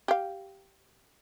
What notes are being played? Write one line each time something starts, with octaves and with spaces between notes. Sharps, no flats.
G4 F5